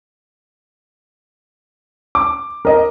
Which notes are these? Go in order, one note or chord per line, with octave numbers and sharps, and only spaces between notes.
D6
A#4 D#5